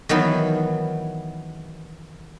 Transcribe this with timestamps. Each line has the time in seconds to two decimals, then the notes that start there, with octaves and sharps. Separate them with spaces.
0.09 D#3 E3 F#3 B3 B5